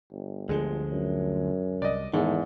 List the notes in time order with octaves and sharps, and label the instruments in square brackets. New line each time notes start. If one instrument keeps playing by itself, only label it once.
[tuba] G1
[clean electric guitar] D2 D3 F3 [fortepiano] G#3
[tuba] F#2
[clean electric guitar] C2 [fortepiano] D5 D#5
[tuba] E2 [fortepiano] G#2 [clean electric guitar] D#3 A3